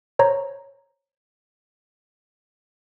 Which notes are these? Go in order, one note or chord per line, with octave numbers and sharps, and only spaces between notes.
C5 C#5 A#5